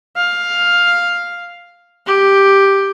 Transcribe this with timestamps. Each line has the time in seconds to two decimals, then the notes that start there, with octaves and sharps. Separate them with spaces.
0.17 F5
2.07 G4